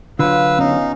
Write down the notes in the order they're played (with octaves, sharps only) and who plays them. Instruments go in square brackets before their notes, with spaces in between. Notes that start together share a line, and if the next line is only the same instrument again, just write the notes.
[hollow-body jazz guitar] D3 F#3 [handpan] F4 [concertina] B4 E6 [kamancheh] F5
[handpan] B3 C#4 [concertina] D#4